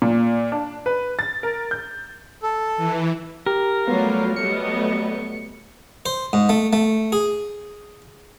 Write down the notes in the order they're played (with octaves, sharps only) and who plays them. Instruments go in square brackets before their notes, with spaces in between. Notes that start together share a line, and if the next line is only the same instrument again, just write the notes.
[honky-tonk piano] A#2
D4
B4
A6
A#4
G6
[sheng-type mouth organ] A4
[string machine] E3
[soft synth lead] G4 [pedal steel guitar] A#4
[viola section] F#3 A3 C#5 [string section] G3 F4 [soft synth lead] B3
[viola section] F#3 G3 D#5 [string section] A3 B3 [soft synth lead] C#7
[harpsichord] C5
G#2
A3
A3
G#4